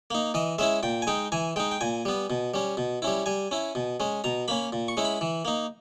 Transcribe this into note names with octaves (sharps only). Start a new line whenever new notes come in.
A#3 D#4
E3 D#5
G#3 C#4 E4 E5
A#2 G5
G#5
G#3 D#4 G5
E3 G#5
G#3 D#4 G5
G5
A#2 G#5
G3 B3
B2
G3 C#4
B2
G3 C#4 E4
G3 G#5
C#4 E4
B2
G#3 C#4
B2 A#5
A#3 C#4 B5
A#2
C#6
G#3 C#4 E4
B5
E3
A#3 D#4